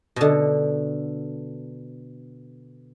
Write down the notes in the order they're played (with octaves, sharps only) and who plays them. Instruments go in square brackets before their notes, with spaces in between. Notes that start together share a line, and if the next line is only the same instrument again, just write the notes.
[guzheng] B2 D3